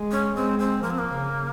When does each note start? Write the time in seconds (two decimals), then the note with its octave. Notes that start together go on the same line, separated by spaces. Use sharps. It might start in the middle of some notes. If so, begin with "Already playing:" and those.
Already playing: G#3
0.12 C#4
0.36 G#3 C4
0.59 C4
0.82 F3 A#3
0.91 C4
0.99 A#3
1.14 C#3